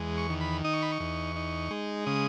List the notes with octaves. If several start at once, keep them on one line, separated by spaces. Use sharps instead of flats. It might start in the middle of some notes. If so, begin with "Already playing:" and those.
Already playing: E2 G#3
C#6
D#3
B5
D#4 D#6
C#6
B5
C#6
E2
D#4
G#3
C#3 D#6